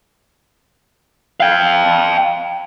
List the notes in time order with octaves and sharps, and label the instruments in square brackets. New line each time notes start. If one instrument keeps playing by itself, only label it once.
[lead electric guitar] F5 G5